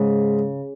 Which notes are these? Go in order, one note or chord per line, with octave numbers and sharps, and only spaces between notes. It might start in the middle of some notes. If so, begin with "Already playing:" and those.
Already playing: G#2 C#3 G#3